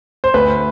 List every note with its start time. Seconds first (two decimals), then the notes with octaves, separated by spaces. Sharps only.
0.24 C5
0.34 D2 B4